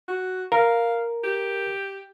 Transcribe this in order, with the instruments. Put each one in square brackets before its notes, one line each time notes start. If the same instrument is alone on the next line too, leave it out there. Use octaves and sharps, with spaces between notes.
[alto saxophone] F#4
[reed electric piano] A#4 [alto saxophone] F5
[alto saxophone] G4